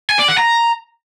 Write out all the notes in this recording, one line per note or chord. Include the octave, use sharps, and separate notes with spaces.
G#5
D5
F#5
A#5